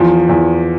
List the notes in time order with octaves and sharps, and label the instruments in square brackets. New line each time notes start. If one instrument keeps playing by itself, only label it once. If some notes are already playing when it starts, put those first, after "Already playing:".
Already playing: [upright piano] E2 [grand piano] F3 F4
[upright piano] E2